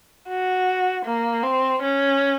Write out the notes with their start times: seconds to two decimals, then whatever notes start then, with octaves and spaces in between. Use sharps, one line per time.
0.28 F#4
1.05 A#3
1.43 C4
1.83 C#4